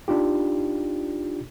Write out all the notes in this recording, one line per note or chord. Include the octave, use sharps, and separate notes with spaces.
D4 D#4 F4 G4